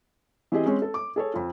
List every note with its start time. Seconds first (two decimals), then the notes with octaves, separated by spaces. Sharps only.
0.52 E3 C4 G4 G#4 D#5
0.65 G#3 C4 C#4 C#5
0.82 A4
0.94 D6
1.16 G#4 A4 C#5
1.34 F2 F4